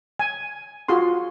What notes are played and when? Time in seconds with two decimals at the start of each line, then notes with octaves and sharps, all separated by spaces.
0.19 G#5
0.88 F4 F#4 G#4 C6